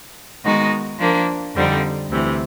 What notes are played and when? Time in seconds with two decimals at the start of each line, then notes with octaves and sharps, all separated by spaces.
0.44 D#3 G#3 B3 D#4 F#4
0.99 F3 A#3 D4
1.55 F2 D3 G3 C4 D#4
2.09 D2 C3 E3